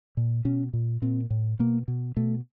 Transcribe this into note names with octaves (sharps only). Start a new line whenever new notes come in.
A#2
B2 C#4
A#2
A#2 C4
A2
B2 A#3
B2
B2 A3